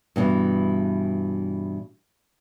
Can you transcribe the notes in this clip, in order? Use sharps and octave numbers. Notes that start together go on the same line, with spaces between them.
G2 B2 E3